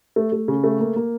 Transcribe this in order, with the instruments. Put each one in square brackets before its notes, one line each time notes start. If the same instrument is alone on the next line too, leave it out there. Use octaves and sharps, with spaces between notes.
[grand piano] A3
A3
C#3
A3
A#3
A#3